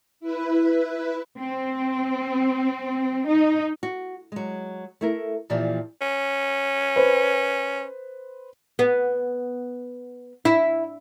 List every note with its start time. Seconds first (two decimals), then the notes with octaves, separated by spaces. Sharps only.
0.20 E4 B4
1.38 C4
3.27 D#4
3.83 F#4
4.32 F#3 G#3
5.01 A3 E4 A#4
5.50 A#2 E3 F3 D#4 G4 D5
6.01 C#4
6.96 B4 C5
8.79 B3
10.45 E4